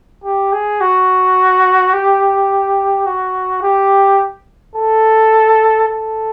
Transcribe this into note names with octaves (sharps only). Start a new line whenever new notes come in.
G4
G#4
F#4
G4
F#4
G4
A4
A4